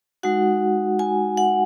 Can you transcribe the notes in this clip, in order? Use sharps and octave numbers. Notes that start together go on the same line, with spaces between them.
G#3 D#4 F#4 F#5
G#5
F#5